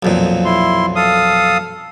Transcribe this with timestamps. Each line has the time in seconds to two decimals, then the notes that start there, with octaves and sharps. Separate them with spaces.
0.03 B1 F2 A#2
0.45 E4 C6
0.96 A4 F5 D#6